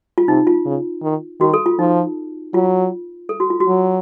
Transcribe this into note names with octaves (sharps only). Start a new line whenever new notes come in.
F4
C3 D#4
F4
C#3
D#3
D#3 F#4
A4
F4
F3 D#4
F#3 F4
A4
F#4
F4
F#4
F#3